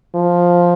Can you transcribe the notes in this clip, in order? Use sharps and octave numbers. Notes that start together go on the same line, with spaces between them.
F3